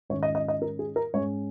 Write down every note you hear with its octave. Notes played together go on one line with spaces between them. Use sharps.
G#2 D#3 C#4 C#5
D#5
D#5
D#5
A#4
G#4
A#4
G#2 G#3 C#4 C#5